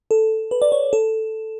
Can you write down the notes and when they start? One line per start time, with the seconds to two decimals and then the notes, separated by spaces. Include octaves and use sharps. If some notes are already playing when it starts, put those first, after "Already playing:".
0.11 A4
0.51 B4
0.62 D5
0.72 C#5
0.93 A4